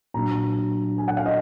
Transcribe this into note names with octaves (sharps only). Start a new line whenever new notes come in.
A#2 F#3 D4 A#5
G#5
F#5
F5
D#5